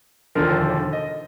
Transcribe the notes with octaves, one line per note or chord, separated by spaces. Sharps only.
E1 D#2 D3 F3 A#4
D#5